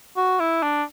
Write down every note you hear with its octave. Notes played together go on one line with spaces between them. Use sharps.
F#4
E4
D4